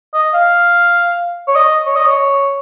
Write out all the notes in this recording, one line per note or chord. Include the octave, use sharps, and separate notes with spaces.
D#5
F5
C#5
D#5
C#5
D#5
C#5